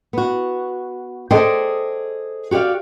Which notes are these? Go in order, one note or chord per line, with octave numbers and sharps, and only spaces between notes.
B3 F#4
G#4 A4 C5 D5 D#5 G5
F#4 G4 C#5 D5 F5